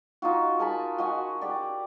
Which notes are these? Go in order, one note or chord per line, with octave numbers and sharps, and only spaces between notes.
D#4 F4 F#4
A#4 G#5 A5 B5
F#4 D#5 F#5 G#5
G4 D5